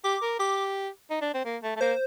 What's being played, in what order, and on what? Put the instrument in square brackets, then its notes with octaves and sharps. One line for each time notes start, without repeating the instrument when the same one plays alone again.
[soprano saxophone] G4 [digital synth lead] D6
[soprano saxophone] A#4
[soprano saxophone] G4 [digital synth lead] D6
[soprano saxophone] D#4
D4
C4
A#3
A3
A3
[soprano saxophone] A#3 [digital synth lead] C5